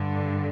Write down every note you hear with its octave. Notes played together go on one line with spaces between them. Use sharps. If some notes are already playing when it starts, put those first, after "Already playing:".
Already playing: G2 D3